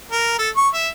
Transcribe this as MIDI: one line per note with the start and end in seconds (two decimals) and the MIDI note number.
0.12 0.36 70
0.39 0.50 69
0.56 0.68 85
0.74 0.89 76